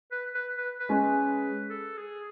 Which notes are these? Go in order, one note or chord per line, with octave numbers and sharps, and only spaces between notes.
B4
B4
B4
B4
G#3 C#4 G#4
B4
A4
G#4